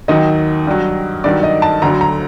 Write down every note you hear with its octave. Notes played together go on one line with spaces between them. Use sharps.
D#2 D#3 F#3 D#5
G2 F#3
G2 D#3 F#3 D5
D#5
A5
D2 D3 F#3 A#5
A#5